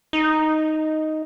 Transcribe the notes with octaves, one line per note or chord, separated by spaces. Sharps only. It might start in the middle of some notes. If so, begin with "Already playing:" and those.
D#4